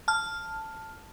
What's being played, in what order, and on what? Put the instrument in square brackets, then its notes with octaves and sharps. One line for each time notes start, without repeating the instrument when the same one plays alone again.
[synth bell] A5 F6